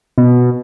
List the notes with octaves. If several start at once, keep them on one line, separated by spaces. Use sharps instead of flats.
B2